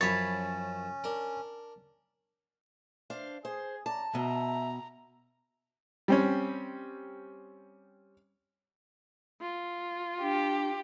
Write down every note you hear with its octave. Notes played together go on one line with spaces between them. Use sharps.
F#2 F3 C#4 C#5 B5 A6
D4 A#4
D4 C5 F5
G#4 C5
C#4 D5 A5 A#5
B2 E5 A#5
G3 C4 C#4
F4
D4 G4